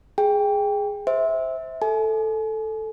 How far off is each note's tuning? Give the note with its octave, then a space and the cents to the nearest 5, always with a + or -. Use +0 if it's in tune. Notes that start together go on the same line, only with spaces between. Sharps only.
G#4 +0 G5 +15
C5 +0 E5 -15
A4 +0 G#5 +40